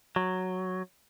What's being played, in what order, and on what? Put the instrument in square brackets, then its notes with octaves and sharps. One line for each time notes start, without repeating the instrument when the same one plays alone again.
[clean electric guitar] F#3